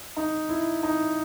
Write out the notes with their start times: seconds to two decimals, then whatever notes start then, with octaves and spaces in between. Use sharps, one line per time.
0.17 D#4
0.49 E4
0.83 D#4